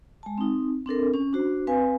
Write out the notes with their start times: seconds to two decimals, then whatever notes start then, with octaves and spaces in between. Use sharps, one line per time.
0.23 G#3 A5
0.38 C4 D#4
0.86 C4 D4 A4 A#4
1.14 C#4
1.33 D4 F#4 C5
1.67 C4 B4 F5 G#5